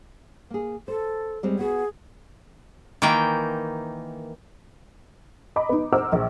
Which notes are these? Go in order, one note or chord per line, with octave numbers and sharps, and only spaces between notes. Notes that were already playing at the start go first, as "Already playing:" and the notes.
A#3 G#4
A4 C5
G3 G#3 C4
B3 F#4 G#4
D#3 E3 A#3 G5
D#5 A#5 B5 D6
B3 D#4
C5 F#5 A#5 D6 E6 F6
A#1